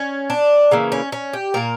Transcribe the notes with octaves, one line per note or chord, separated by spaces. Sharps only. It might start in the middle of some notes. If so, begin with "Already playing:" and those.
Already playing: C#4
D4
C#3 E3 A#3
C#4
C#4
G4
A#2 A#3 A#4